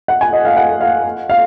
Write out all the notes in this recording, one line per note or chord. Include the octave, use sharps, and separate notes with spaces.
F#5
G#5
D#5
F5
F#5
F5
F5